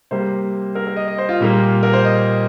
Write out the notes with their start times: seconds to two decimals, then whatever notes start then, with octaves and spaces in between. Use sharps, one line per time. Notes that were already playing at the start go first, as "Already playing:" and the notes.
0.11 C3 G3 A#3 C5
0.75 A#4
0.87 A#4
0.96 D#5
1.08 D#5
1.18 C5
1.29 F4
1.40 A#2 G3 A#3
1.83 A#4
1.93 C5
2.05 D#5